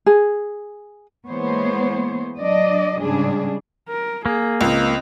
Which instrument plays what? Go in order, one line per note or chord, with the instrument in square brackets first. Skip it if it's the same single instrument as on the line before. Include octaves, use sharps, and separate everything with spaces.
[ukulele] G#4
[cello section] E3 G#3 A#3 B3 C5 C#5
F#3 D4 D5 D#5
G#2 C#3 G3 G#3 D4 G#4
[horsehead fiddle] A#4
[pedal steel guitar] A#3 [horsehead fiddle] G#4
[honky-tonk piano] C#2 [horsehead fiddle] C4 D#5